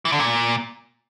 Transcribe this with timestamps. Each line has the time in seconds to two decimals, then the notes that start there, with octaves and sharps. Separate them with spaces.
0.05 E3
0.12 D3
0.19 A#2